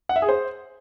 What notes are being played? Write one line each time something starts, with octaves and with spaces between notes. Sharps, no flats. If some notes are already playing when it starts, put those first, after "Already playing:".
F#5
E5
G#4
C5